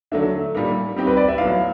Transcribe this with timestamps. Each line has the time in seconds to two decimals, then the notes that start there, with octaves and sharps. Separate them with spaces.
0.12 D3 F#3 A3 D4 E5
0.55 A#2 G3 A#3 D#4
0.96 G3 C4 D#4 G4
1.07 B4
1.17 D5
1.28 E5
1.38 A2 F#3 B3 F5